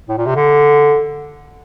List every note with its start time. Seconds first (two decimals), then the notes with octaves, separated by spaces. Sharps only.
0.09 A2
0.18 A#2
0.26 C3
0.36 D3